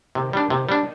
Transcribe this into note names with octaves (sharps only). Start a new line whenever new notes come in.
C3 D#3
G3 D4
C3 D#3
G3 D4